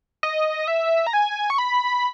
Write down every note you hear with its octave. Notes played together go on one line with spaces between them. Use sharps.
D#5
E5
A#5
G#5
C#6
B5